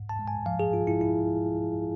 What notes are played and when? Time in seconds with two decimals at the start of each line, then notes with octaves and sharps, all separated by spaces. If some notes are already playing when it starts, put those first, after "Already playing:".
Already playing: G#2
0.09 A5
0.19 G#3
0.28 G#5
0.46 F3 F5
0.59 G#4
0.73 G#2 F4
0.87 E4
1.01 E4